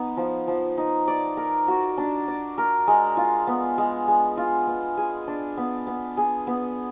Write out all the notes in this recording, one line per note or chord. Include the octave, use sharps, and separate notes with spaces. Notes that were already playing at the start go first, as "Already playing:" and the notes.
Already playing: B3 D#4
F3
F3
D#4
D5
A#4
F#4
D4
D5
A#4
G#3
F4
B3
G#3
G#3
F4
B3
G#4
D4
B3
B3
G#4
B3